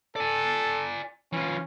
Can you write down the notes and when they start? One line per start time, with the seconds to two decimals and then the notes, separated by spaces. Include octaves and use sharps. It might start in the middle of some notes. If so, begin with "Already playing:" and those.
0.16 A4 D5 G#5
1.33 E3 C#4 F4